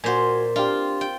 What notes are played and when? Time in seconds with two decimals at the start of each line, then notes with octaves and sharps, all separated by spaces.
0.04 A#2 F#4 C5 G#5
0.56 C4 D4 F4 G4
1.01 G5